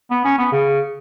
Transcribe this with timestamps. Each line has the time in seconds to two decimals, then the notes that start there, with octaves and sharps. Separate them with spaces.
0.11 B3
0.24 C#4
0.38 B3
0.52 C#3